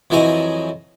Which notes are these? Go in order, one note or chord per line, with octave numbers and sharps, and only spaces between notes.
F2 E3 F#3 G#4 D#5